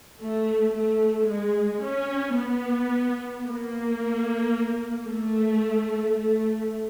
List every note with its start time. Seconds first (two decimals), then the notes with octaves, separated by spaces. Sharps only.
0.20 A3
0.75 A3
1.29 G#3
1.84 C#4
2.37 B3
3.46 A#3
5.08 A3
6.17 A3